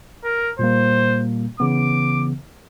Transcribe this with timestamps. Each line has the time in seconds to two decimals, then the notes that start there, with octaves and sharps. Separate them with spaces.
0.24 A#4
0.59 A#2 G3 A#3 C5
1.60 C#3 E3 B3 D6